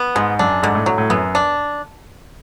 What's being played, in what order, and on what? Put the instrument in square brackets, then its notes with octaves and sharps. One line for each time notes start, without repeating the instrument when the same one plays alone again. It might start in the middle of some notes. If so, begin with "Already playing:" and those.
Already playing: [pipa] B3
[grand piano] G#2 [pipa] G#3
[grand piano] F#2 [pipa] D4
[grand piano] G#2 [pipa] D3
[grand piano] A2
[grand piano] A2 [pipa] F#3
[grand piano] A2
[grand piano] F#2 [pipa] B3
[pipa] D4